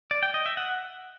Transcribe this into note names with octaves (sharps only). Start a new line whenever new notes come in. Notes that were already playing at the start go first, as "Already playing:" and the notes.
D5
G5
D#5
E5
F#5